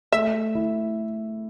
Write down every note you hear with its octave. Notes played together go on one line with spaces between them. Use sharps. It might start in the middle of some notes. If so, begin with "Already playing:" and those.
A3 E5
E4